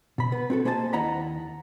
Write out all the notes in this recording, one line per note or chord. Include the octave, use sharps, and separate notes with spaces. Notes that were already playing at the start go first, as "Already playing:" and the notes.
B2 B5
B3
C4 F#4 A4
A#3 G#4 C5 D#5 F#5 A5
D#2 E4 D#5 F#5 A#5 B5